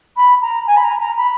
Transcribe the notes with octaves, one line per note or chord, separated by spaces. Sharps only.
B5
A#5
G#5
B5
A#5
A#5
B5